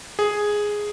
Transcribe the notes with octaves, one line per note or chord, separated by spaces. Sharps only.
G#4